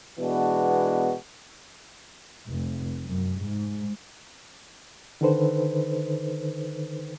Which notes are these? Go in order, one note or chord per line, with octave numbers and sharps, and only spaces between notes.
B2 E3 G#3 B3 D4 F#4
F1
F#2
G#2
D3 D#3 D#4 A4 B4 C5